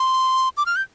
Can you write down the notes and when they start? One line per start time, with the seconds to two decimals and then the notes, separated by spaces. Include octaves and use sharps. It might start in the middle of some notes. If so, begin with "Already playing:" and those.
Already playing: C6
0.57 D6
0.66 F6
0.76 G6